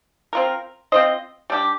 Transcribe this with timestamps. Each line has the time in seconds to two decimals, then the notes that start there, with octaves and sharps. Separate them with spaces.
0.33 C4 F4 A#4
0.92 C4 F4 C5 D#5
1.50 G3 D4 G4